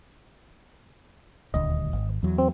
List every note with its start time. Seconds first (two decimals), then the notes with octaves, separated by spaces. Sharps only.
1.54 D#1 D2 D#5
1.93 G#1
2.23 E2 F#3
2.38 C4